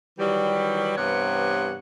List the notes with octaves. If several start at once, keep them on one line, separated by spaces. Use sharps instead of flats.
D#3 E3 F#3 G3
G2 C3 E3 B3 C#5 F#5